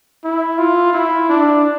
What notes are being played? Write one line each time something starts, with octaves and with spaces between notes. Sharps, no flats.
E4
F4
E4
D4